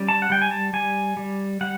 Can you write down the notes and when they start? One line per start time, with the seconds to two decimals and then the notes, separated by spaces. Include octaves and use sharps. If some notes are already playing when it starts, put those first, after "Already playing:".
Already playing: G3 C#4
0.08 A5
0.22 F#5
0.30 G3 G5
0.42 G#5
0.51 A5
0.73 G3 G#5
1.17 G3
1.61 G3 F#5